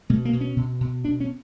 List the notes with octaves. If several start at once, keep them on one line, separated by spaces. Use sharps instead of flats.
B2 A3
A#3
B2
C#4
B2
B2
B2 D4
C#4